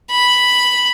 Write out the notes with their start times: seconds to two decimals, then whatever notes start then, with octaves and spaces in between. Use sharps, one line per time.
0.11 B5